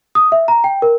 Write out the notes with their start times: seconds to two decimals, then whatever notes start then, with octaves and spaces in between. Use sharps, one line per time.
0.15 D#6
0.32 E5
0.48 A#5
0.64 G5
0.82 A#4